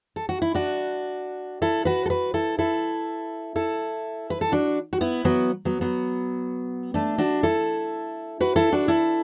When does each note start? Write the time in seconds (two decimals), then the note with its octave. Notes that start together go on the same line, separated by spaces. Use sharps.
0.16 A4
0.29 F#4
0.42 E4
0.54 D4 F#4
1.62 E4 A4
1.85 F#4 B4
2.06 A4
2.10 F#4 B4
2.34 E4 A4
2.59 E4 A4
3.56 E4 A4
4.30 B4
4.41 A4
4.52 D4 F#4
4.93 F#4
5.01 B3 E4
5.25 F#3 B3
5.65 F#3 B3
5.81 F#3 B3
6.94 A3 D4
7.18 D4 F#4
7.43 E4 A4
8.40 F#4 B4
8.56 E4 A4
8.72 D4 F#4
8.88 E4 A4